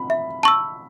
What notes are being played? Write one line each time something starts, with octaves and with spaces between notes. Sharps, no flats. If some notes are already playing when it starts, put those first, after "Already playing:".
Already playing: B5
E5
A5 C#6 E6